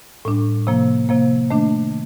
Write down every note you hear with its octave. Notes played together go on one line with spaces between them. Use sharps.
A2 G3 D4
C3 F3 A#3
C3 F3 A#3
D#3 A3 D4